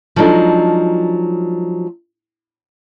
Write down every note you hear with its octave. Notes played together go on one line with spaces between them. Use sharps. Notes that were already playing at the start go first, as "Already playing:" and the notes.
F3 F#3 G#3 D4 D#4 A4